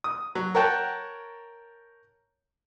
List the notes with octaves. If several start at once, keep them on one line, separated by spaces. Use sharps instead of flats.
D#6
F#3
A#4 C#5 F#5 G5 A5